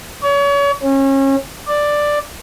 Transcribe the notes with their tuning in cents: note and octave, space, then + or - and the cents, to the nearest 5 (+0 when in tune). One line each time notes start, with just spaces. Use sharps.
C#5 +35
C#4 -30
D5 +5